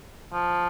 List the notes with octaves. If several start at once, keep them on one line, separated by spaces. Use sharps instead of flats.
F3